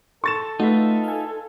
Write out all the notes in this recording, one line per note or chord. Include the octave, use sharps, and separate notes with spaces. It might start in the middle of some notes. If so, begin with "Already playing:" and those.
A4 C#6 A6 E7
A3 D#4 F4 F#4 B4 E5
F5 G#5